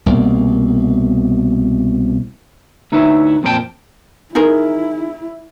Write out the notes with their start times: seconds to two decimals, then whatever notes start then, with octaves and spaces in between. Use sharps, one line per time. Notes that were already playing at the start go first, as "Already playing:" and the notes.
0.06 C2 B2 A#3
2.92 D2 D#4 E4 B4 C#5 E5
3.43 F2 A#2 F3 C#4 G5 A5
4.35 D#4 E4 G#4 A#4